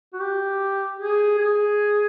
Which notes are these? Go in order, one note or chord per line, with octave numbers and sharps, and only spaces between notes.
F#4
G4
G#4
G#4